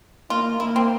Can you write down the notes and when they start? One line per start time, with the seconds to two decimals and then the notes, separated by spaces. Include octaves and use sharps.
0.30 A#3 F4
0.60 A#3 E4
0.76 C4